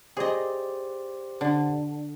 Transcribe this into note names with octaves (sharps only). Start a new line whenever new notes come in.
G4 G#4 C5 D5 D#5
D3